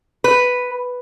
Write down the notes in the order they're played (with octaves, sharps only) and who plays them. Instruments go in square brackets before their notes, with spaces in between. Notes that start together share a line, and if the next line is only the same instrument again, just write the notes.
[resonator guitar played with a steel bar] B4